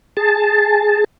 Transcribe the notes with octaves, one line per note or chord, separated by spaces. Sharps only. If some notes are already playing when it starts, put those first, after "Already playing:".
G#4 A5